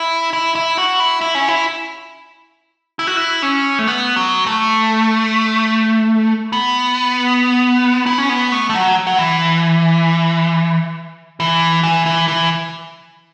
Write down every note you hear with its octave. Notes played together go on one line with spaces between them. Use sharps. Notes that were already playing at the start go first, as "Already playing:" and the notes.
Already playing: E4
E4
E4
F#4
E4
E4
C#4
E4
E4
F#4
E4
C#4
A3
B3
F#3
A3
B3
E4
C#4
B3
A3
A3
F#3
F#3
E3
E3
E3
E3
E3